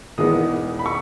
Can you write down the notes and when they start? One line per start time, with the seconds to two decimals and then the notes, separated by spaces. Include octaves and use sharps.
0.18 E1 E2 D#3 G#3 B3 D#6
0.79 B5
0.86 C#6